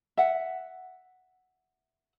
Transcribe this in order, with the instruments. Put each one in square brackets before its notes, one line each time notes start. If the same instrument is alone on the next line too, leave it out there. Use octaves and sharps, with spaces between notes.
[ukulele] E5 F#5